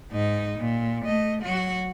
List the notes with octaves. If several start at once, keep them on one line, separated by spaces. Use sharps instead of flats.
G#2 D#4
A#2
A3 D#5
F#3 F#4